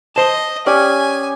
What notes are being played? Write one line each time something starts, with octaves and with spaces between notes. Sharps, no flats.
C5 D#5 A5
C#4 G4 D5 G#5 D#6